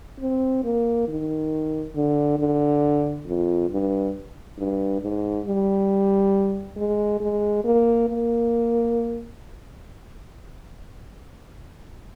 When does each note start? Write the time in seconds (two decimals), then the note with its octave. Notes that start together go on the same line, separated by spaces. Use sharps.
0.20 C4
0.64 A#3
1.08 D#3
1.95 D3
2.39 D3
3.27 F2
3.70 G2
4.58 G2
5.02 G#2
5.46 G3
6.77 G#3
7.21 G#3
7.64 A#3
8.08 A#3